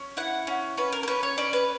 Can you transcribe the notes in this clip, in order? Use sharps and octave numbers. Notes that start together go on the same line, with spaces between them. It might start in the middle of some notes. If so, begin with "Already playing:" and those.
Already playing: C#4
E4 F#5
C#4
C#4 B4
A#4
A#4
C#4 B4
C#5
C#4 D5
B4